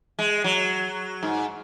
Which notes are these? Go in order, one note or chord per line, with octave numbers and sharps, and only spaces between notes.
G#3
F#3
G#2